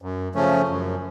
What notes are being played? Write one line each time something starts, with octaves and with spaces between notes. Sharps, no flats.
F#2
C#3 F3 A3 C#4
F#2